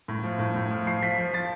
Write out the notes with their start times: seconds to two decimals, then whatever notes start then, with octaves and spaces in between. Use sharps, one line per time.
0.08 A2
0.24 F3
0.39 A2
0.56 A2
0.71 F3
0.87 F3 C7
1.02 F3 B6
1.18 F3
1.33 F3 A6